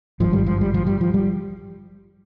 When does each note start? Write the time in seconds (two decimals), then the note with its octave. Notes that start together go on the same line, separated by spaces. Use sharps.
0.20 G#1 G2 F3
0.33 G3
0.46 F3
0.61 G3
0.74 F3
0.87 G3
1.01 F3
1.14 G3